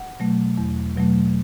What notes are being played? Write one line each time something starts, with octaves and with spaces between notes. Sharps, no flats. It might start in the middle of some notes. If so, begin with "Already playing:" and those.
Already playing: F#5
B2 F#3 A3
E2
B2 F#3 A3